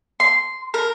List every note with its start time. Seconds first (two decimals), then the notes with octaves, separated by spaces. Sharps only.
0.20 C6
0.74 A#4